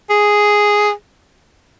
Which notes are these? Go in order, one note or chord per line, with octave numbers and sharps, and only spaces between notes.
G#4